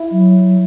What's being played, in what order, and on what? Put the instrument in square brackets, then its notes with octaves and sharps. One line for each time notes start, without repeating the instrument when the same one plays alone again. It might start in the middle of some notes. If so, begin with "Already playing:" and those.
Already playing: [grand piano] E4
[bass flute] F#3